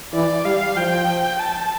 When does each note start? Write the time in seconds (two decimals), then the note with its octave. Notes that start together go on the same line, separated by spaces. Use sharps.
0.13 E3 D5
0.45 G3 F5
0.76 F3 G5
1.40 A5